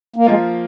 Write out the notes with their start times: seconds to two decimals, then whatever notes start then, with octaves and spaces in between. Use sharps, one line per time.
0.16 A#3
0.27 F3 G#3 A#3 F4